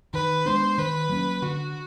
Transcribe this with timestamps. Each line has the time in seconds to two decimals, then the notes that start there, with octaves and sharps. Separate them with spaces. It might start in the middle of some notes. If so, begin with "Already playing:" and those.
0.14 D#3 B4
0.46 G#3 B3 D4 C5
0.78 D#3 B4
1.10 F#3 A#3 C#4
1.42 D3 F#4